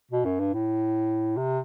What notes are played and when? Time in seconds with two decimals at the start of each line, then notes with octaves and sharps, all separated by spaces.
0.11 B2
0.25 F#2
0.39 G2
0.53 A2
1.37 C3